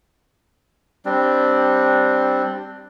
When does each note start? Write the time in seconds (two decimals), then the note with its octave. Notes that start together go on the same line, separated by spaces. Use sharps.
1.05 G3 C4 D4